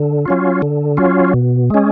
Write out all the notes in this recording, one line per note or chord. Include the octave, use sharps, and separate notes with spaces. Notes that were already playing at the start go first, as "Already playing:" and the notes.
Already playing: D3
F#3 C#4 F4
D3
F#3 C#4 F4
B2
G#3 C#4